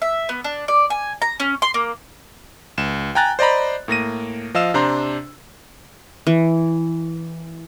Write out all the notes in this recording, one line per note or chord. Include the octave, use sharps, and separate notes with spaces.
E5
B3
D4
D5
G#5
A#5
C#4
C6
A#3
C#2 E7
G5 G#5 A#5 F#6 A6
C5 D5 D#5 A#5 B5
A2 A#3 A#6 D#7
F3 D#5 F5 E6 E7
C3 D4 C5 A#5 C6
E3